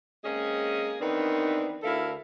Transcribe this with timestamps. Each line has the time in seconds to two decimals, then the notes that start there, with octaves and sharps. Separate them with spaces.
0.24 G#3 A#3 C4 C#4 G#4
1.00 D#3 E3 B3 C4 D4 D#4
1.83 D2 E4 A4 A#4 E5 F5